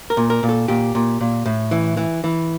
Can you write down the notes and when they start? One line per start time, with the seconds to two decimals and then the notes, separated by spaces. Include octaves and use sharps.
0.10 A#4
0.17 A#2
0.30 A#4
0.43 A#2
0.49 A4
0.68 A#2 G4
0.95 A#2
1.21 A#2
1.46 A2
1.71 E3
1.97 E3
2.24 E3